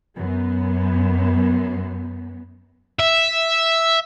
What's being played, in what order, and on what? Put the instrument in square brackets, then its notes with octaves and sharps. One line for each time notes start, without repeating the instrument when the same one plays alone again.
[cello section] F#2 B3
[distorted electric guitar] E5